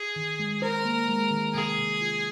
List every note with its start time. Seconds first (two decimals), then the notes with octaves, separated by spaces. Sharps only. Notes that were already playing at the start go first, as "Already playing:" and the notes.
Already playing: G#4
0.16 D#3
0.39 G#3
0.62 A#4 C5
0.85 A#3
1.08 G#3
1.31 D#3
1.54 C3 G#4
1.78 C3
2.01 F4